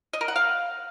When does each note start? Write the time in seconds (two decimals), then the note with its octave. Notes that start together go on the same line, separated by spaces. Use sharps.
0.13 D#5
0.21 A#4
0.28 F#5
0.36 F5